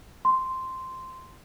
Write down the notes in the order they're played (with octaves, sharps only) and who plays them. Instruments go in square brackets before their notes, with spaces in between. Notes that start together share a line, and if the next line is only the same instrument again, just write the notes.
[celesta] C6